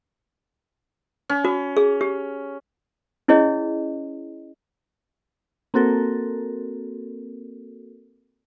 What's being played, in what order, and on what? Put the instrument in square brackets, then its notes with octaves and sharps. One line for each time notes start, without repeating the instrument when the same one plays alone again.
[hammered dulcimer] C#4
[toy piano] F#4
G#4
G4
C#4 E4 G#4 C#5 D#5
[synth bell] A#3 C4 F#4 A4 A#4